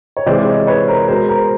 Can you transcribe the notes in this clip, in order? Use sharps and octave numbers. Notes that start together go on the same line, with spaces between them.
C#5
C3 E3 G#3 C5 D5
C#5 D#5
B4 C#5
A#4 C5
B2 G#3 A#4 C5
A#4 C5